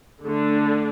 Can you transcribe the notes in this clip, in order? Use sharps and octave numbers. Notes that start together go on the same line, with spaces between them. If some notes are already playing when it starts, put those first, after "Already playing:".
D3 A3 D4